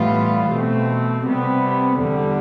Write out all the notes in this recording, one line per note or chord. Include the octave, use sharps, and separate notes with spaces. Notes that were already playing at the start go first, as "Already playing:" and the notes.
Already playing: A2 E3 G3 B3 F4
B2 A3 C4
C3 G3 B3
E2 D3 G3